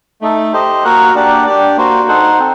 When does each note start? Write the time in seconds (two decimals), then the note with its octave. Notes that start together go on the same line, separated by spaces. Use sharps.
0.21 A3 D#4 A4
0.53 G4 C5 D#5
0.84 A#3 F#4 A#4 F#5
1.15 A#3 D4 G4 D5 F#5
1.46 D4 G4 D5
1.77 A#3 F#4 C5
2.08 D#4 A4 C5 F#5
2.39 C4